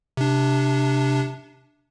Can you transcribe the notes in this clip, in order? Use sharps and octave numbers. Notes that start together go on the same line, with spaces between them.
C3 D4